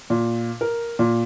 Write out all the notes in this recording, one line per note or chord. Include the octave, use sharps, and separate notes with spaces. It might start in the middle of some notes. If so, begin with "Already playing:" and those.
A#2
A#4
A#2